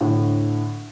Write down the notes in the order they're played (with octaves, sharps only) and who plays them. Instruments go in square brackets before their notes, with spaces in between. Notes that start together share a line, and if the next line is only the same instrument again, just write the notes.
[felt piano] A2 D3